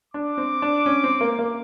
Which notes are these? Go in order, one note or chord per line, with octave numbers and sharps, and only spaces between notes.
D4 D6
C4
D4
C#4
C4
A#3
A#3